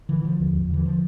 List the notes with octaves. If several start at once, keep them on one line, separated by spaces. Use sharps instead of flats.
D3 E3
D3 F3
E2
E2
D3 E3
F3